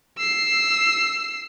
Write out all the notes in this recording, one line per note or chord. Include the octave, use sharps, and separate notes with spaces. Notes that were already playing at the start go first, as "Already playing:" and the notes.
E6 C7